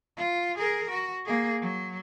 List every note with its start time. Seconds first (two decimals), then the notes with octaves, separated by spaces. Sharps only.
0.17 F4
0.58 G#4 A#4
0.90 F#4
1.25 A#3 G#4
1.61 F#3